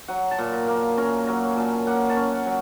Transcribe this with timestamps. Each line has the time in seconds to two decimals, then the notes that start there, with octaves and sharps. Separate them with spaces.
0.08 F#3 F#5
0.31 A5
0.38 A#2
0.53 A#5
0.68 A#3
0.76 A5
0.97 C#4 A#5
1.27 F#3 A#5
1.57 A#2 A5
1.87 A#3 F#5
2.10 A5
2.17 C#4
2.32 F#5
2.46 F#3